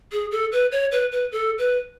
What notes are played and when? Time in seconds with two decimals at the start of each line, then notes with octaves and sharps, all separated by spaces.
0.12 G#4
0.31 A4
0.52 B4
0.72 C#5
0.92 B4
1.12 B4
1.32 A4
1.58 B4